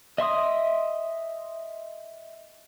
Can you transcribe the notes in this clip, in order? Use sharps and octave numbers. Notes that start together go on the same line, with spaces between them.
D#5 E5 C6 D#6